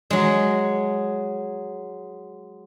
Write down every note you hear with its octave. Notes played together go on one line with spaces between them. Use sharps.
F#3 G#3